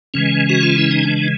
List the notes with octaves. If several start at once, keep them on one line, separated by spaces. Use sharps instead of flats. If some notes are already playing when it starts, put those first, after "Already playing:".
C#3 E3 G#3 C#4
F#4
F4
E4
D#4
D4